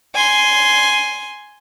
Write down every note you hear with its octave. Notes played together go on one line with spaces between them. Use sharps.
G#5 C6